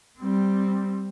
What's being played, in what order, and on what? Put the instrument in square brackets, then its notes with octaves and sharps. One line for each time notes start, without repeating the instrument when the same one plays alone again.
[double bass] G3 C4